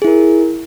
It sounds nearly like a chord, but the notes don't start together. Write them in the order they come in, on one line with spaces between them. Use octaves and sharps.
G#4 E4 A#4